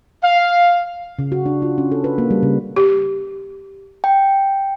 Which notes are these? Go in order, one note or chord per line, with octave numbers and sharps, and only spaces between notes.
F5
C#3
F#4
D4
F4
C#4
A4
B4
A#3
G3
C#3
G4
G5